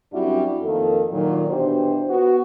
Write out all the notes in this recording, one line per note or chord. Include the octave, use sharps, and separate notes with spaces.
F#2 G3 C4 D4 E4 F#4
F2 D#3 A#3 A4
A#2 D#3 F#3
B2 E3 D4 F#4 G4 C5
B3 F#4